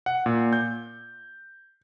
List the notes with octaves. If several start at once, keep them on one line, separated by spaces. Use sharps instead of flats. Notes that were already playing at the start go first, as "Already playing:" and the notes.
F#5
A#2
G6